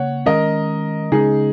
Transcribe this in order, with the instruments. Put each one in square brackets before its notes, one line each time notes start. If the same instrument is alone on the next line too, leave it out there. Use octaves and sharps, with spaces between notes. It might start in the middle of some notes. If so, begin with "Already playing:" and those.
Already playing: [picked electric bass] C#3 A#3 [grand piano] C#5 F#5
[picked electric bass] D#3 G#3 C#4 [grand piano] A#4 D#5
[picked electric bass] C#3 G#3 C#4 [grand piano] D#4 G#4